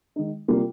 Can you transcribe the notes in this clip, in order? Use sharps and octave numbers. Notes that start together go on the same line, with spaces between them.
D#3 G#3 D#4
C3 G3 A#3 F4